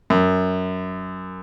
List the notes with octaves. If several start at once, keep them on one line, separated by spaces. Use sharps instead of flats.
F#2